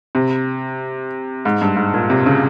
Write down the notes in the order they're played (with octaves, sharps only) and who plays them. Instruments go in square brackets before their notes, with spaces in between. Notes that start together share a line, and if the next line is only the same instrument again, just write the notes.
[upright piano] C3
G#2
G2
G#2
A#2
C3
C#3